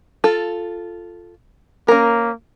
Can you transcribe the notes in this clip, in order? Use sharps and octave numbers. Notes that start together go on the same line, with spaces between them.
F4 A4
A#3 C#4 A#4